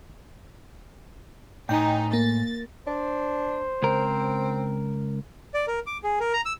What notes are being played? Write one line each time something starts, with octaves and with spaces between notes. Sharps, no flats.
A2 D#4 G5 G#5
A#3 A6
D4 C5
C#2 C4 A#4
D5
A#4
D6
G#4
A#4
A#5
E6